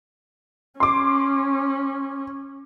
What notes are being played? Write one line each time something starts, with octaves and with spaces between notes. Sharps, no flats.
C#4 C6 D6